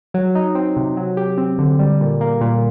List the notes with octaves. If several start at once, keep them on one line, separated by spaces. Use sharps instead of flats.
F#3
D#4
C4
C3
F#3
G4
C4
D3
G3
A#2
A#3
A#2